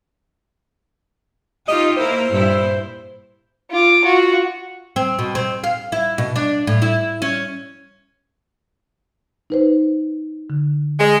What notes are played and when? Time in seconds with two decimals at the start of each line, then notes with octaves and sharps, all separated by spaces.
1.68 D#4 F4 G4 D#5
1.97 A#3 E4 A#4 C5
2.31 G2 A#2 E4
3.70 F4 D6
4.03 F4 F#4
4.96 C4
5.19 B2
5.35 C4
5.64 F5
5.92 E4
6.18 B2
6.36 D4
6.67 A2
6.82 E4
7.22 C#4
9.50 D#4 B4 C5
10.50 D3
10.98 G#3